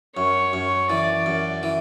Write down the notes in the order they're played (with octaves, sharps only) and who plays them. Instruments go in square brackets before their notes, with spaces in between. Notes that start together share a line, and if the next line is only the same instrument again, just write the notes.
[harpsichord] F#2 [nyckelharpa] C#5
[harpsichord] F#2
[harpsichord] E3 [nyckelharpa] D5
[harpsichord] F#2
E3